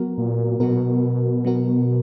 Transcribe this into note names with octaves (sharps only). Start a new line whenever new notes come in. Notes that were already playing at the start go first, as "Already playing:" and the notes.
Already playing: F#3 B3 F#4 A#4
A#2
B2 F#3 B3 F#4 A#4
F#3 B3 F#4 A#4